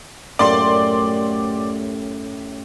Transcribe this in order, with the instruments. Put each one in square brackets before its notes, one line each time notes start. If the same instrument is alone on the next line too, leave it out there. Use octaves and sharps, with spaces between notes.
[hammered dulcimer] F#2 A2 G4 [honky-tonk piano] D5 C6